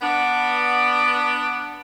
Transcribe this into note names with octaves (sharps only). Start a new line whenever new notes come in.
B3 D4